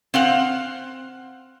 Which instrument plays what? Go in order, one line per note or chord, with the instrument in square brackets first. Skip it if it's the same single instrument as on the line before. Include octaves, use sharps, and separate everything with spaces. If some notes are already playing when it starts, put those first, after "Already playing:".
[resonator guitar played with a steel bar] C4 F5 F#5